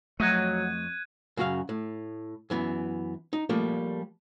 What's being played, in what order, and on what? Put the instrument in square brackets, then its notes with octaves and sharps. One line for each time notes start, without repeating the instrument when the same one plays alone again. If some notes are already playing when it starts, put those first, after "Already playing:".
[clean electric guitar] F2 C#5 D#5 [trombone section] F#3 [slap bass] A3 [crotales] F#6 G#6 D#7
[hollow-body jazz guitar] F#2 C#3 F#4 G#4 F5
A2
F#2 E3 B3
D#4
F3 G3 A3 A#3